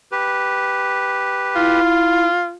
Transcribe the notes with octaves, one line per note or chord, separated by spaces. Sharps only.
G4 B4
E4 F4